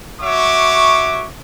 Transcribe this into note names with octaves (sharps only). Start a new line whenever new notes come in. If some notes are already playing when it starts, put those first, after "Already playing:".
F#4 C#5 E5 C#6 D6